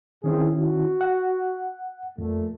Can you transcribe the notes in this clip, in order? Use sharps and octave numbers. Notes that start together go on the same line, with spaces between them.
A#2 D#3 C4 C#4 E4 G#4
F#4
F#5
F2 A#2 A3